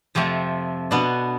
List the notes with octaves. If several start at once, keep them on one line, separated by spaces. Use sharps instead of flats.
F2 C3 F3 A3 C4
B2 B3 D4